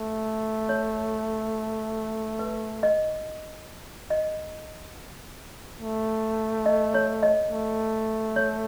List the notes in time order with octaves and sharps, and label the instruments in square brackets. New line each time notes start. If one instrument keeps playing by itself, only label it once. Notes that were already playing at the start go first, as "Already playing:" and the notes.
Already playing: [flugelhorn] A3
[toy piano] C#5
B4
D#5
D#5
[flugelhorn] A3
[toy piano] D#5
C#5
D#5
[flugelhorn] A3
[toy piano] C#5